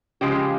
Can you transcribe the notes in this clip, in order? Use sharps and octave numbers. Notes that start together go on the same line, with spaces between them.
C#3 F3 G#3 G4